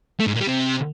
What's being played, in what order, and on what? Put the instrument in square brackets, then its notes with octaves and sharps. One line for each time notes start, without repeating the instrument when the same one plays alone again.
[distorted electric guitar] A3
G#2
A#2
G3
C3